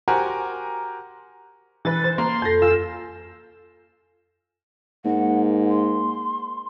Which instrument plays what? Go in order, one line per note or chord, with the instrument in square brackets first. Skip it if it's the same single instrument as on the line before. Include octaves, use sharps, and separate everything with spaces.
[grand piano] F#4 G4 A#4 C5 F#5 G#5
[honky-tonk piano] E3 B4 [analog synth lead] A6
[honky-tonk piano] C5
[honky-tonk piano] A#3 [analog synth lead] C6
[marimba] F2 A4 [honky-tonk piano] G6 A#6
[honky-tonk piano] F4 [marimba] G#5 [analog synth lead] E6
[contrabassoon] G#2 [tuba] A#3 [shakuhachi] F#5
[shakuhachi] C6